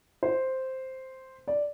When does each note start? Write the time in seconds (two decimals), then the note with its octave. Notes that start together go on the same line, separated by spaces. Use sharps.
0.23 C5
1.48 D5